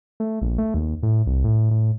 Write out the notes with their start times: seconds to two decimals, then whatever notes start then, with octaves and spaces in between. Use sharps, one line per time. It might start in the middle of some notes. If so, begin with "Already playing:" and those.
0.20 A3
0.42 A#1
0.58 A3
0.74 D#2
1.03 A2
1.27 C2
1.44 A2
1.71 A2